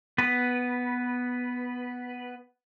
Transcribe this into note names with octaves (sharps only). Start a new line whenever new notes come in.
B3 B4